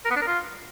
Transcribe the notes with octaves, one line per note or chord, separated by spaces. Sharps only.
A#4
B3
D4
A#4
F4